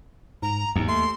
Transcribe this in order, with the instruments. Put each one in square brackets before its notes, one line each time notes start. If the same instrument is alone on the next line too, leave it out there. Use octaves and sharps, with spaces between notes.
[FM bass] G#2 [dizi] A#5
[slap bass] D#2 [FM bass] G#2
[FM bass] A3 [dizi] C6